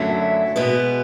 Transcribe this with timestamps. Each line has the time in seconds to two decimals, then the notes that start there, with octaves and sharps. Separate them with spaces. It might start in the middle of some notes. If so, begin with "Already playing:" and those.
Already playing: F#2 D3 F#3 A3 E4
0.56 B2 G#3 B3